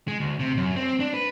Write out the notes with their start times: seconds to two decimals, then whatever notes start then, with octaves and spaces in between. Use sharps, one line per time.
0.08 G#3
0.20 D2
0.39 C3
0.57 F#2
0.76 C4
1.00 D4
1.14 B4